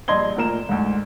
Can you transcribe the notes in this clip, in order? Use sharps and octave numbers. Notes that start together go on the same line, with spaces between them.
A#1 G2 D#5 C6 G#6 G7
D2 A#2 A#4 E7
D2 G#2